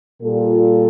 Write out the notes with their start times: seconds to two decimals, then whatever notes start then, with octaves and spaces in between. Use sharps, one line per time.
0.22 A#2 G3 F4 A4